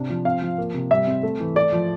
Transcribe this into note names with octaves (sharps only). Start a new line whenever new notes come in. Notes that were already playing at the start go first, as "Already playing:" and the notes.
Already playing: C3 D4
F3
C4 F5
F3
A#3
C3
G3 E5
C4
A3
E3
A3 D5
F3